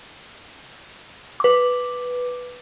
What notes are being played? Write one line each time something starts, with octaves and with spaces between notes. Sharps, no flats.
B4 D6